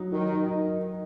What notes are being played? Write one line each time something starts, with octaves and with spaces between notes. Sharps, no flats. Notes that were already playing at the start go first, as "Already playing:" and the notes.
Already playing: F#3 D#4
D#3 F#3
D#4